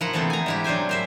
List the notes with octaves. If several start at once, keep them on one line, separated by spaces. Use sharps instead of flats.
F3 E4 A#4 F#5
C3 E3 A3 B3 A4 C5
G#5 A#5
G#3 E4 G4
F#3 D4 C5 G5 G#5
A#4 C5 E5